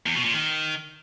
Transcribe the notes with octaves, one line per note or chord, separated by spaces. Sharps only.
E2
B2
A#2
D#3